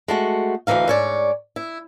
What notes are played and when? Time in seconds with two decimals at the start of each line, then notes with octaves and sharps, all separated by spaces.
0.08 G#3 A3 F#4
0.67 D2 A#2 E3 D#4 F5
0.88 G#2 C#5 D5
1.56 E4